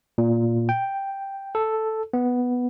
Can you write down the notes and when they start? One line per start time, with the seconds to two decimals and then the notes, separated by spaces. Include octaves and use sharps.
0.18 A#2
0.69 G5
1.55 A4
2.13 B3